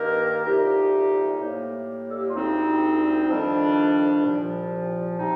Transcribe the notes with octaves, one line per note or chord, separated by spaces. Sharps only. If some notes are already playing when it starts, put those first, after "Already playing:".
Already playing: G2 D#3 A#3 G4 A#4
C2 A#2 A3 D#4 G4
A2 G3 A#3
A4
G4
F4
D2 D3 G3 C4 D#4
F2 D#3 G3 D4
C2 A#2 F3
C3 G3 C4 D#4